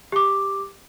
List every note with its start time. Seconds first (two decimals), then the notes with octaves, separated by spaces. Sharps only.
0.12 G4 D6